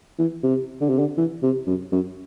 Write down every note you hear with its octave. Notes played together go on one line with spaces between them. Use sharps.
E3
C3
D3
C3
D3
E3
C3
F#2
F#2